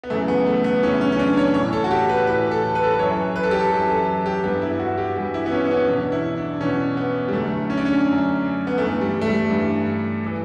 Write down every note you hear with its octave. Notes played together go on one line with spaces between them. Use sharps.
B3
F#2 C#3 E3 A3
B3
A3
B3
F#2 C#3 E3 C#4
C#4
C#4
D4
C#5
A2 E3 C#5
A4
F#4
G4
B4
A2 E3 B4
A4
B4
A4
B4
F#2 E3 C#5
B4
A4
G4
A4
F#2 E3
A4
G4
G2 E3 B3
E4
F#4
G4
G2 E3
E4
B3
C#4
B3
C#4
E2 B2 D4
E4
D4
E2 B2 C#4
B3
G3
F#2 D3 A3
C#4
D4
C#4
F#2 D3
B3
G2 E3 A3
G3
A3
G3
G2 E3
E3